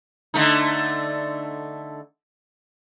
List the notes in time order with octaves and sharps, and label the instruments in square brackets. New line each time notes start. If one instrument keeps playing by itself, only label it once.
[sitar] D3 A3 D#4